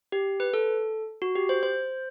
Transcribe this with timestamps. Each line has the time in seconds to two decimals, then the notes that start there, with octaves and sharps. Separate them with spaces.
0.12 G4
0.40 B4
0.54 A4
1.22 F#4
1.36 G4
1.49 C5
1.63 C5